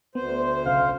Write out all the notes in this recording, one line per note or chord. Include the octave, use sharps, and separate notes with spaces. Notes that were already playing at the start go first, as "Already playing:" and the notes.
D2 B3 C5
B1 C#3 F5